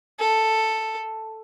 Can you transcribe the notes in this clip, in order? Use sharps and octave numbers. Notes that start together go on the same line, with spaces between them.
A4